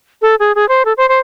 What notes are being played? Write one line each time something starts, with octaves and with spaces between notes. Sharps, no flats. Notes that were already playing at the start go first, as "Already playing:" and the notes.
A4
G#4
G#4
C5
A4
C5
C5